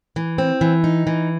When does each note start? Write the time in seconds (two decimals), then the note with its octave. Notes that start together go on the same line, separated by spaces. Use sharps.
0.16 E3
0.38 C4
0.61 E3
0.84 D#4
1.07 E3